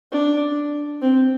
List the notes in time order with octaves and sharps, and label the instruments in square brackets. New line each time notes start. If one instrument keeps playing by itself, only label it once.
[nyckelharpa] D4
C4